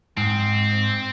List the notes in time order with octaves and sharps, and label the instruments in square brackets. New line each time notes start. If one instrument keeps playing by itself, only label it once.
[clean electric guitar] G#2 [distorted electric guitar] C4